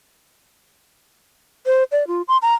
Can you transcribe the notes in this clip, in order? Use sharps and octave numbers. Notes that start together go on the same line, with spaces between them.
C5
D5
F4
C6
A#5